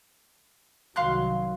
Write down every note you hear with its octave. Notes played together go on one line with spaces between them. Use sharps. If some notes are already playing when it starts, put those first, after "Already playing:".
C2 D#3 F#3 F5 C6 F#6